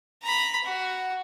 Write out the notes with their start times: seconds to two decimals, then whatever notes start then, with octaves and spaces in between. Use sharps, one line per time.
0.23 A#5 B5
0.64 F#4